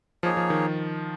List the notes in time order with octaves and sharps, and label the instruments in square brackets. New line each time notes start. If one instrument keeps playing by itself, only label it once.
[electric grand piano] F3 [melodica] A#3 D#4 G#4 C#5
[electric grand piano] F3
D#3